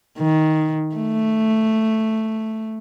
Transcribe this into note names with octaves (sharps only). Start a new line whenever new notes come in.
D#3
A3